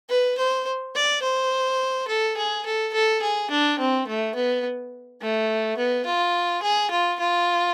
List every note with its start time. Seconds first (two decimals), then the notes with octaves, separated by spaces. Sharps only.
0.09 B4
0.38 C5
0.95 D5
1.22 C5
2.08 A4
2.37 G#4
2.65 A4
2.94 A4
3.22 G#4
3.50 D4
3.79 C4
4.07 A3
4.35 B3
5.21 A3
5.77 B3
6.06 F4
6.63 G#4
6.90 F4
7.20 F4